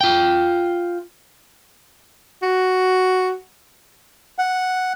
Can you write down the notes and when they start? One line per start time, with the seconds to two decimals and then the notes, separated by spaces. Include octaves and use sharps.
0.01 F4 G5
2.43 F#4
4.38 F#5